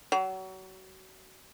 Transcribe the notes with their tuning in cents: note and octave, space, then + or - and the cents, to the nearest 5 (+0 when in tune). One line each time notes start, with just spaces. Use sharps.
F#3 +30